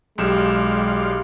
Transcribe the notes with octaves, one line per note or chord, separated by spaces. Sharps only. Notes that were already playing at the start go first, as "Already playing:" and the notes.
B1 G#3 G4 D5 F5 C6 E7